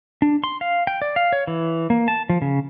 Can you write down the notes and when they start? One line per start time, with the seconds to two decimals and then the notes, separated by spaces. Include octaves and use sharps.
0.22 D4
0.44 C6
0.61 F5
0.87 G5
1.02 D5
1.16 F5
1.33 C#5
1.47 E3
1.90 A#3
2.08 A5
2.30 F3
2.42 C#3